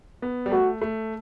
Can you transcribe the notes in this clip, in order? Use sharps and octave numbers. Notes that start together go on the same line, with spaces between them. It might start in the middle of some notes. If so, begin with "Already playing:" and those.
B3
G3
A3 F#4
A3